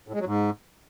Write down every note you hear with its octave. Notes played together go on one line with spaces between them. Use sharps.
A2
G#3
F#3
G#2